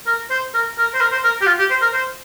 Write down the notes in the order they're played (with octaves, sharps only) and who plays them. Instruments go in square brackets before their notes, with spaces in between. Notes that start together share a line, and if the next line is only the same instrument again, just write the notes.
[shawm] A#4
C5
A#4
A#4
C5
A#4
C5
A#4
G4
F4
G4
C5
A#4
C5